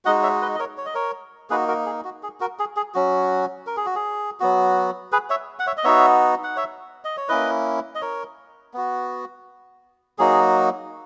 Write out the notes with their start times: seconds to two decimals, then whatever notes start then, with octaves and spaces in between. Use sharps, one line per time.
0.05 G#3 D#4 F#4 D#5 F#5
0.23 C#5 E5
0.42 B4 D#5
0.55 D#5
0.59 A#4 C#5
0.78 C#5
0.86 D#5
0.95 A#4 C#5
1.50 A#3 D#4 F#4 G#4 B4
1.68 F#4 A#4
1.86 G#4
2.04 F#4
2.23 G#4
2.40 F#4 A#4
2.59 G#4
2.76 G#4
2.94 F#3 C#4 F#4
3.67 A#4
3.77 G#4
3.86 F#4
3.96 G#4
4.40 F#3 B3 F#4
5.12 G#4 B4
5.30 C#5 E5
5.59 F#5
5.67 C#5 E5
5.77 D#5
5.84 B3 D#4 F#4 C#5 E5
6.43 F#5
6.56 C#5 E5
7.04 D#5
7.17 C#5
7.28 A#3 C#4 E4 B4 D#5
7.95 D#5
8.01 A#4 C#5
8.74 B3 F#4
10.18 F#3 A#3 D#4 F#4 G#4